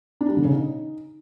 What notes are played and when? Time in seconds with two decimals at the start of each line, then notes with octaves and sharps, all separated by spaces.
0.21 D4
0.29 G3
0.37 D3
0.45 C#3
0.53 D#4